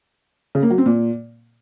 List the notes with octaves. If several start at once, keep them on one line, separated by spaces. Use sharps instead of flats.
C#3
A#3
F#3
C4
A#2